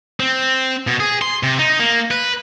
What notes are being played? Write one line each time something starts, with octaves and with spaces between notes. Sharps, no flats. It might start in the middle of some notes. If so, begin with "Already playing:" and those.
C4
B2
G#4
C6
C3
D#4
A#3
B4